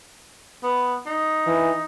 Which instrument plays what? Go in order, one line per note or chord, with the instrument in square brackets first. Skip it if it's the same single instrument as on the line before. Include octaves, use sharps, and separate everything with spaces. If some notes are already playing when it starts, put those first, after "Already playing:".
[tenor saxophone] B3
D#4
[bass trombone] E3